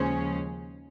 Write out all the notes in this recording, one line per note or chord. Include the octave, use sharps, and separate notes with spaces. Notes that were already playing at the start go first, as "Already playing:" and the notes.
Already playing: D#2 C#3 F3 G#3 C#4 C5